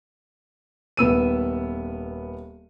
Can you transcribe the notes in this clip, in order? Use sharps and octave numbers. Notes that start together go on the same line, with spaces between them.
D#1 B3 E6 D#7